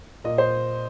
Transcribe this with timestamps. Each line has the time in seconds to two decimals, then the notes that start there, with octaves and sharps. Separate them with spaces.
0.24 A#2 D#5
0.38 C5